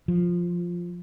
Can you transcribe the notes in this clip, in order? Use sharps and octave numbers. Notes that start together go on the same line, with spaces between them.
F3